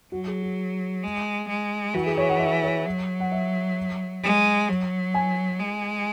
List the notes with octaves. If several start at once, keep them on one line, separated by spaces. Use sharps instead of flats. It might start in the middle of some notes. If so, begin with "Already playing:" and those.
F#3 F#4
G#4
F#4
G#3
G#3
E3 F#4
G#4
C#5
F#5
E5
C#5
F#3
F#5
E5
G#3
F#3
G#5
G#3